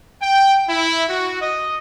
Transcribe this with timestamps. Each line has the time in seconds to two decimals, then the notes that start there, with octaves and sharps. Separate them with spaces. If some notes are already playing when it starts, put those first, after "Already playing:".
0.21 G5
0.68 E4
1.08 F#4
1.42 D#5